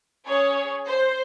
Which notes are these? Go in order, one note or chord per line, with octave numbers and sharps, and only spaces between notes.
C#4 G#4 C#5
C5